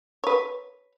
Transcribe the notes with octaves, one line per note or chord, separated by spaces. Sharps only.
B4 C#5